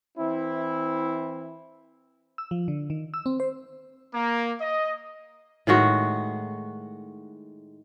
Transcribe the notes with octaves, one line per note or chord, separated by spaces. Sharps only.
E3 C4 E4
E6
F3
D3
D#3
E6
C4
C5
A#3
D#5
A2 D#3 G#3 F#4